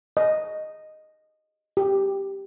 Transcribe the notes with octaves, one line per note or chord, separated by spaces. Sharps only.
D#5
G4